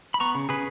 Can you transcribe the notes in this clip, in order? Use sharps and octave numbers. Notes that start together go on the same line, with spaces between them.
B5
B3 A#5 C#6
C#3
C#3 G#4 B4